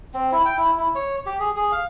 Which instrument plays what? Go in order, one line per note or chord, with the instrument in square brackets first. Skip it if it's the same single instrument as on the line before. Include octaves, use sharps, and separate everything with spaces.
[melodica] C4
E4
G5
E4
E4
C#5
G4
G#4
G#4
F5